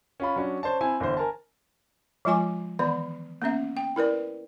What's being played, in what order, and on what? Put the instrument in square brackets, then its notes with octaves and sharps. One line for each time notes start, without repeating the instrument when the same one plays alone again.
[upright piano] C#4 F4 B5
F#3 C#4 D4
C#4 C5 D5 A5
C4 E4 G#5
G1 E3 C5
A#4 G#5 A5
[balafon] F3 G#3 F4 G#5 D6
D#3 E3 B3 D5 B5
A#3 B3 C#4 E5
G5
E4 A#4 B4 D5